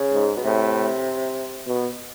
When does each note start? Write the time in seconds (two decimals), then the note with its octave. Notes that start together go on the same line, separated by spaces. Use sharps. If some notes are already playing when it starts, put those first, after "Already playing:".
Already playing: C#3
0.13 G#2
0.37 B2
0.44 A2 C3
1.67 B2